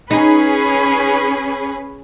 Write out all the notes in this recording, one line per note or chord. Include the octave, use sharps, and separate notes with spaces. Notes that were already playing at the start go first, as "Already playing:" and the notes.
C#4 D#4 G#4 B4